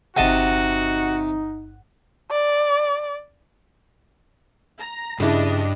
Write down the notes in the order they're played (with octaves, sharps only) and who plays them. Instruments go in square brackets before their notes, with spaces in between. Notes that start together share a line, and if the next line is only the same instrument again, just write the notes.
[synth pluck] G1 F#5 [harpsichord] C3 D#5 A5 [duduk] D#4 [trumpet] F#4
[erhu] D5
[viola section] A#5
[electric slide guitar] G2 [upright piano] C#3 E4 [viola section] D4 D#5